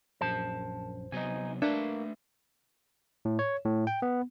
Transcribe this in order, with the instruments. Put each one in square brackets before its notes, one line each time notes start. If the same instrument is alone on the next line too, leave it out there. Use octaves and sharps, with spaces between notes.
[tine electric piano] A#1 F#2 [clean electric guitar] C5 A5
[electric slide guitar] C3 F#3 B3 [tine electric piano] D#4 G#5
[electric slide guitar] A3 B4 E5 [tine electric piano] A#3 [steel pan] D4
[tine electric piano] A2
C#5
A2
G5
B3